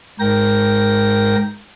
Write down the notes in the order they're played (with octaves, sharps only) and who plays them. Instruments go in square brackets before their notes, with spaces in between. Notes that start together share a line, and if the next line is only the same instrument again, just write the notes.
[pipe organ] G#2 A#4 G5 A#6